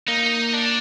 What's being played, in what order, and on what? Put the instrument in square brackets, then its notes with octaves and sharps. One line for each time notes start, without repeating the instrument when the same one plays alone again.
[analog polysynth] A#3 [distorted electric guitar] D#4
[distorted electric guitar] D4